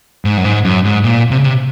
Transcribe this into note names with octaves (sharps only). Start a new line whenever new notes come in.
G#2
F#2
G#2
F#2
G#2
A#2
C3
C#3
C3